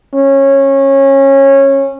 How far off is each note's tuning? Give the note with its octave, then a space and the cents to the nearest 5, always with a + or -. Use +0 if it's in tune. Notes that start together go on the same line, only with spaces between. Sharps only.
C#4 -20